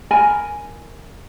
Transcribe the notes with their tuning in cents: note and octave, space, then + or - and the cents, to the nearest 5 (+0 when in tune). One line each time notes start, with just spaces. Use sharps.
A#4 +0 G#5 +0 B5 +0